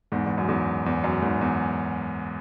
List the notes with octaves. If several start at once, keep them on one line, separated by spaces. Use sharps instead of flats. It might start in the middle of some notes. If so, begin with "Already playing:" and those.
E2 G#2
E2
F#2
E2 G#2
E2
F#2
E2 G#2
E2